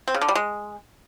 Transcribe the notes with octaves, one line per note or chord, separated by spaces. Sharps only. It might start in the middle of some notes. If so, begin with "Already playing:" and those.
C4
C#3
D3
G3
G#3